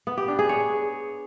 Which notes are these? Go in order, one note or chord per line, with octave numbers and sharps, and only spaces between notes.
B3
G4
D4
G#4
C#5